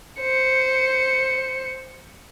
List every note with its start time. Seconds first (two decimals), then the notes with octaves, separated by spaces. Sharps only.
0.20 C5 C#7